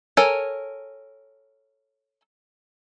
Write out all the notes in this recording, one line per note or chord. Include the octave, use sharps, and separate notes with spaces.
A4 A#4 C#5 G#5